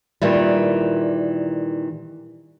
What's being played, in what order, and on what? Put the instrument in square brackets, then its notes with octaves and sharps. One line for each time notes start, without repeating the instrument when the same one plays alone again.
[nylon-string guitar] A#2 D#3 E3 G3